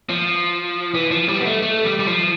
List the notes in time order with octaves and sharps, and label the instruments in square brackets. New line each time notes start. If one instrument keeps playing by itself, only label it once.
[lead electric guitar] F3
E3
F3
G3
B3
A3
A3
G3
G3
F3